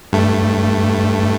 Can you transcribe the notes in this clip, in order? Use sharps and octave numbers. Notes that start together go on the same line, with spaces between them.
G2 A3